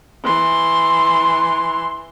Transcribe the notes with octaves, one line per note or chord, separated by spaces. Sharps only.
E3 C6